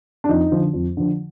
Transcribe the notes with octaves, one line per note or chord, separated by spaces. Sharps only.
D4
F2 D#4
D3 F3
F2
D3 F3